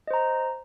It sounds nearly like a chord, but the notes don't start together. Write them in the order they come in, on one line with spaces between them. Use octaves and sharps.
D#5 C5 A#5